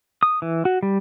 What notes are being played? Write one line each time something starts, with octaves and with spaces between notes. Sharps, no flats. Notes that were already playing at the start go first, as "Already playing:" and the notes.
D#6
E3
F#4
G3